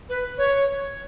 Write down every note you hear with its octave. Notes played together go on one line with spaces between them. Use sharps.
B4
C#5